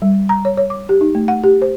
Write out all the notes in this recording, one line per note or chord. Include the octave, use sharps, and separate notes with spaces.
G3
A#5
C#5
C#5
D6
G4
D#4
A3
F#5
G4
C5